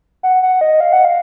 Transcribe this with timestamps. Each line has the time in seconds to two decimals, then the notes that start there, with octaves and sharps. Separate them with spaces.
0.23 F#5
0.43 F#5
0.61 D#5
0.80 F5
0.93 F#5
1.05 F5